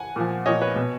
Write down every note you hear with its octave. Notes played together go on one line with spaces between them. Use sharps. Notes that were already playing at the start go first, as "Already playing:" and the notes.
Already playing: F#5 G#5
A#2 F3
A#2 F3 C#5 D#5
B4 C#5
B2